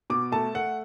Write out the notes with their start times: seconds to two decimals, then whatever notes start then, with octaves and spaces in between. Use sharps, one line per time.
0.10 B2 D6
0.32 A3 A5
0.54 A3 F#5